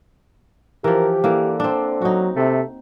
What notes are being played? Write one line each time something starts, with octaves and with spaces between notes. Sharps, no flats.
E3 F3 G4 A#4
D3 E3 A#3
C4 D4
F#3 D#4 F#4
C3 A3